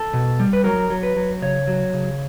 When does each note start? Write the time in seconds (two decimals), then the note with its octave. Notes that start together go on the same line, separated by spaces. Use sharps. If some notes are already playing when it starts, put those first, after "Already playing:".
Already playing: A4
0.13 B2
0.40 G3
0.53 B4
0.64 F#3 A#4
0.90 F#3
1.03 B4
1.16 F#3
1.42 C#3 C#5
1.67 F#3
1.94 C#3